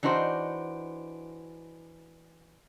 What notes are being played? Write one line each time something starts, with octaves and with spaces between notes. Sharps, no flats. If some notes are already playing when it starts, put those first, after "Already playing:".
E3 D4 D#4 F#4 C5